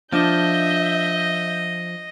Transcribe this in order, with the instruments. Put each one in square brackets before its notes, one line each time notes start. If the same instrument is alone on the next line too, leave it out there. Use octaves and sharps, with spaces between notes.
[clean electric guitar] F3 [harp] D4 [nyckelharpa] D#5 [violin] E5 G6